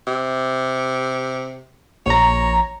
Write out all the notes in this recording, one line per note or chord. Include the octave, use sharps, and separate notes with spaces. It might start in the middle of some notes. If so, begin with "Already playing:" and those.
C3
A#1 C#5 A#5